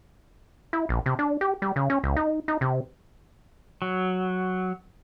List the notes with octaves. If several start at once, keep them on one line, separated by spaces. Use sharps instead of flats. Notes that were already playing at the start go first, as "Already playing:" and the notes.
E4
A#1
C3
D4
G4
G3
C#3
C#4
C#2
D#4
D#4
C3
F#3